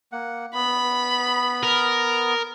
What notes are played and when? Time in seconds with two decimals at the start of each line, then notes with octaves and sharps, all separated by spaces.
0.12 A#3 F#5
0.54 B3 B5
1.63 A#4